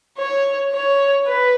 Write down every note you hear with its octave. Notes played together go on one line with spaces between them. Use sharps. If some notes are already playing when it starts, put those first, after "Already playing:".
C#5
C#5
B4